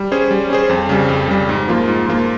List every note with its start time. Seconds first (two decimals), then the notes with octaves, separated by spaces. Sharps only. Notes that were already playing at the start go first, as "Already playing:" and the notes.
Already playing: G3
0.12 C#4 G#4 C5
0.31 G3
0.50 C#4 G#4 C5
0.69 F2
0.89 C#3 G3
1.09 F2
1.28 C#3 G3
1.49 G#2
1.68 F3 A#3 F4
1.88 G#2
2.08 F3 A#3 F4